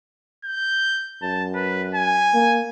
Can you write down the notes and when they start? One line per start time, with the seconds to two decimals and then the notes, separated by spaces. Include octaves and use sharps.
0.44 G6
1.22 F#2 A5
1.55 B4
1.95 G#5
2.34 A#3